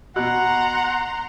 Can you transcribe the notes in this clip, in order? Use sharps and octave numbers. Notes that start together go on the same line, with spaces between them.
B2 F#5 A#5 C6 F#6